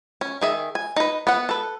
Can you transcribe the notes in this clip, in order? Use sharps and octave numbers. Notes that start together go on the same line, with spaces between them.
C#4
D#3 G#4 E5
G#5
D#4 B4
B3 F#5
A4 B4